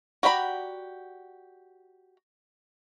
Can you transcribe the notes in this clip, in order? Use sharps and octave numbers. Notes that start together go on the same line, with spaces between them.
F#4 G4 D5 A#5 B5